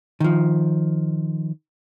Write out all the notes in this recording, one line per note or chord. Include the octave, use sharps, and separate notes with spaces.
D#3 F3